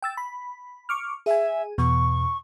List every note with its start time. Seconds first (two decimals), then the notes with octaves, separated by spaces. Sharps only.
0.02 G5 E6 A6
0.17 B5
0.89 C#6 D6 F6
1.26 G#4 E5 G#5
1.78 E2 B2 C#6